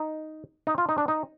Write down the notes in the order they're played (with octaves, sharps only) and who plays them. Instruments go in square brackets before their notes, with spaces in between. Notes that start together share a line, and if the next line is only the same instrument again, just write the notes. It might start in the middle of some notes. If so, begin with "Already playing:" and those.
Already playing: [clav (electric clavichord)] D#4
D#4
F4
D#4
D4
D#4